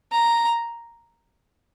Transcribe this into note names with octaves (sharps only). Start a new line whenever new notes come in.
A#5